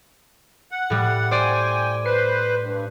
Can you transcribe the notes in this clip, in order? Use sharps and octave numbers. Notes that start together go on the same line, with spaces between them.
F#5
A2 G3
C5 D5 G5 G#5
B4 C5 C7
G2